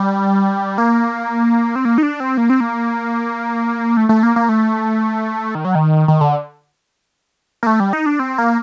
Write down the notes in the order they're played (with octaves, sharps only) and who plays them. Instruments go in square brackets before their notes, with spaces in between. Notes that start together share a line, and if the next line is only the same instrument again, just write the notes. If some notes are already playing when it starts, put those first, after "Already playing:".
Already playing: [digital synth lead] G3
A#3
C4
A#3
D#4
D4
C4
A#3
C4
A#3
A3
A3
A#3
A#3
A3
D#3
F#3
D#3
D#3
D3
A#3
A3
G3
D#4
D4
C4
A#3